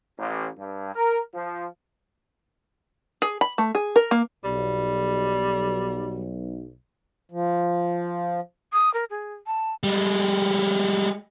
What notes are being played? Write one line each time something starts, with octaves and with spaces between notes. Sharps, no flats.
A1
G2
A#4
F3
G#4
B5
A3
G#4
A#4
A#3
B1 G3
F3
D#6
A#4
G#4
A5
G3 G#3